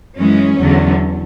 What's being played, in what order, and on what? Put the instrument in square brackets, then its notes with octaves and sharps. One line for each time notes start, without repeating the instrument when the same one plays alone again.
[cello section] F#2 E3 G#3 C#4
E2 D3 F#3